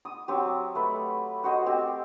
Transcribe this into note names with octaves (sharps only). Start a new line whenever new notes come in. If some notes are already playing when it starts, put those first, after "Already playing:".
D#6
F#3 C4 G4
A3 B4
F#4 C5 D#5
C4 G4 G#5 E6